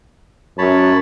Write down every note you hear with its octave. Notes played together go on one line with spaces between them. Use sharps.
F#2 C#5 A5 B5